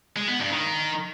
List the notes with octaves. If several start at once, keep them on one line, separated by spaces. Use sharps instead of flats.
G#3
B3
G2
D#3